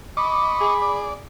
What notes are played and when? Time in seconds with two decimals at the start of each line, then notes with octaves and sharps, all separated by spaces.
0.17 D#5 B5 C#6 D6
0.61 G#4
0.82 D5